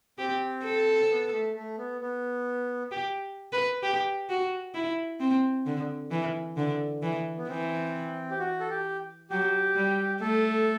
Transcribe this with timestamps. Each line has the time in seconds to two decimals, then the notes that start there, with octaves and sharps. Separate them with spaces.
0.18 C4 G4
0.64 A4
1.10 B3
1.32 A3
1.55 A3
1.78 B3
2.01 B3
2.91 G4
3.53 B4
3.83 G4
4.29 F#4
4.74 E4
5.20 C4
5.66 D3
6.11 E3
6.57 D3
7.03 E3
7.38 B3
7.48 E3 C4
8.30 G4
8.39 F#4
8.60 A4
8.70 G4
9.30 F#3 G4
9.76 G3
10.21 A3 A4